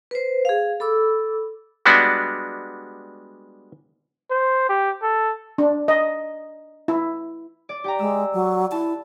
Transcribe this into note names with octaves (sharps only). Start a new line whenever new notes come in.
B4 C5
G#4 F5
A4 B5 D6 E6
G3 G#3 B3 D4 F#4
C5
G4
A4
D4
D#5
E4
D5
G4 G5 A#5
G#3 E6
F#3
E4 A5